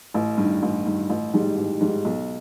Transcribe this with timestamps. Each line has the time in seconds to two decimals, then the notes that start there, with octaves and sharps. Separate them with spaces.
0.14 A1
0.38 G2 D#3
0.63 A1
0.85 G2 D#3
1.10 A1
1.33 G#2 D#3 G3
1.57 A1
1.81 G#2 D#3 G3
2.05 B1